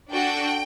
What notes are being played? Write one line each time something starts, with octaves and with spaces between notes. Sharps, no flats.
D4 F#4 A4 G5